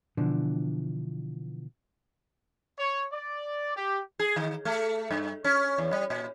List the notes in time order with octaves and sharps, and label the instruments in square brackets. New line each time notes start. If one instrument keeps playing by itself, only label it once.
[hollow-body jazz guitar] B2 D3 E3 F3 D4
[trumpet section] C#5
D5
G4
[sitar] G#4
D#3
A3
G2
C#4
E2
G3
A#2